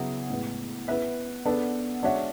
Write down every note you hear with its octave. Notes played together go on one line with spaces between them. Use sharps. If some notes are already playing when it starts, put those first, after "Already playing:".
Already playing: C#3 F#3 B3 E4 G#4
A2 G#3 B3
B3 E4 B4 E5
B3 D4 A4
G#3 D4 F#4 C#5 E5